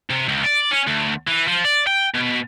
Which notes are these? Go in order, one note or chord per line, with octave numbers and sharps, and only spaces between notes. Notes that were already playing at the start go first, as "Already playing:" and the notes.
C3
C#2
D5
C#4
D2
E3
F3
D5
G5
B2